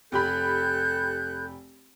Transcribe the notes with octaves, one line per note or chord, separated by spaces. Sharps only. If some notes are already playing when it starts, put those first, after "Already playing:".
F1 G4 A4 B5 F#6 G6